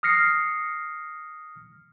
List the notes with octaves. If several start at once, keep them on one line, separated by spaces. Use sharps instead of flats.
D#6 F6 A#6 C7 C#7